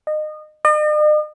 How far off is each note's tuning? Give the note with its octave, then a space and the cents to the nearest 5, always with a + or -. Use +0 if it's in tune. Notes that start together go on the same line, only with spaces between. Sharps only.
D#5 -25
D#5 -45